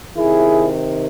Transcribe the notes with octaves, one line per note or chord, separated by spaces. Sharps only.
C3 D#3 E4 G#4